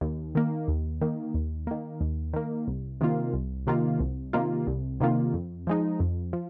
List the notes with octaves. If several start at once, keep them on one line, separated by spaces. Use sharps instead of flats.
D#2
D#3 A#3
D#2
D#3 A#3
D#2
D#3 A#3
D#2
D#3 A#3
C2
C3 D#3 A#3 F4
C2
C3 D#3 A#3 F4
C2
C3 D#3 A#3 F4
C2
C3 D#3 A#3 F4
F2
F3 G#3 D#4
F2
F3